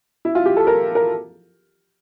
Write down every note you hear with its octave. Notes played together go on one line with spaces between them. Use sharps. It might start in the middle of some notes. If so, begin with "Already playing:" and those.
E4
F4
G4
A4
A#4
A#4